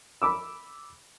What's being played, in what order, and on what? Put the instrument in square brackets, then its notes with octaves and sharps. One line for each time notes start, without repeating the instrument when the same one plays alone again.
[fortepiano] B5 D6 E6